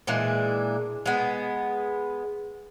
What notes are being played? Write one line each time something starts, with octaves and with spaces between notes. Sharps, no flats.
A#2 E3 G#3 D4
G#3 B3